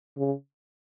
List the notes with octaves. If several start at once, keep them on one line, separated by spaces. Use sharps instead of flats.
C#3